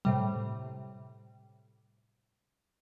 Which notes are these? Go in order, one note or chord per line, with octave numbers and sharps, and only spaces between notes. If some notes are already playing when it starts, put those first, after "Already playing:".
A2 C3 G3